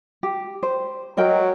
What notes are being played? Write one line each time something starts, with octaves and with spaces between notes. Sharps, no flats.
G4
C5
F#3 A#4 D#5 G5